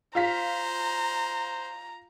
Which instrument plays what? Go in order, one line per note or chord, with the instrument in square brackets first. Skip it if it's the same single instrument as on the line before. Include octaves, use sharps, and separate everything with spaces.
[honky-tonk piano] F4 F5 B6 [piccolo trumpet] C5 [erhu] A#5